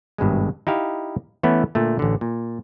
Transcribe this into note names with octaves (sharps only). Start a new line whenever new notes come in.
G#1 G2 B2 G#3
D#4 E4 G4 F5
E3 A3 B3 C#4 E4
A#2 D3 A3
A1 D3
A#2